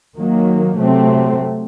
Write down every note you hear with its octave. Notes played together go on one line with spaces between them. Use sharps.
D#3 F#3 A#3
C3 F#3 A3 C4